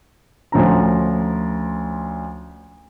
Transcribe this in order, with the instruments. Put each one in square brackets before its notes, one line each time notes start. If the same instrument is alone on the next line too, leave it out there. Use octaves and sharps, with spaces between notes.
[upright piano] D2 F3 C#4 A#5